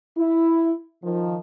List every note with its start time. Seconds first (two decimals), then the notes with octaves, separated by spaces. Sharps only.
0.17 E4
1.03 D#3 F3